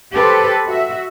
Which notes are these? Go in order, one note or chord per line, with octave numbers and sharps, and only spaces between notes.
G4 A4 B4 C5
F#4 E5